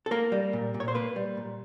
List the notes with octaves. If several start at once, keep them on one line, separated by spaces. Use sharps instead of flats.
A4
A#3 A#4
G3
A#2
A#2
C#5
C5
A#3 B4
G3
A#2